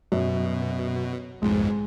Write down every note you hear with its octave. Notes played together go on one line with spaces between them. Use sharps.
F#2 B2
B1 F2 G#2 G#3